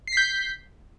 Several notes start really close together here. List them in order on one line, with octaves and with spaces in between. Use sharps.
C7 B6 G6